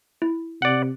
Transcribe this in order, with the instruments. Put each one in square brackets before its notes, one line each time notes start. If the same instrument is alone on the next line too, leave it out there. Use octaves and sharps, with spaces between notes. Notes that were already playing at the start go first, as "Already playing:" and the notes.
[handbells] E4
[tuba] C3 [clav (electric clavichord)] D5 F#5